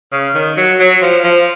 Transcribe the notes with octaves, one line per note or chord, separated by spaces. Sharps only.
C#3
D#3
F#3
F#3
F3
F3